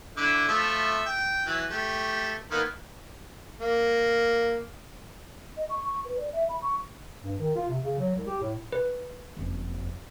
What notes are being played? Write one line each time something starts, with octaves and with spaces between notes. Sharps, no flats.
D3 E4 D6
F3 A3 E5
G5
E3 F#3
A3 G4
D#3 A#3 B3
A#3
D#5
C#6
C#6
B4
D5
E5
B5
C#6
G2
D#3
F4
C3
C#3
F#3
C2
G4
A2
B4
F#1 F2